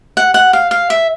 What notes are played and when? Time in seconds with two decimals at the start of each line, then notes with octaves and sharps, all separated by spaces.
0.17 F#5
0.34 F#5
0.53 F5
0.71 F5
0.90 E5